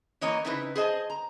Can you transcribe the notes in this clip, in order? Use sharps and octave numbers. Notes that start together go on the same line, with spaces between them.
E3 A#3 C#5 D#5 A#5
C#3 C4 D#4 E4 B4
G#4 C5 D#5 A5
A#5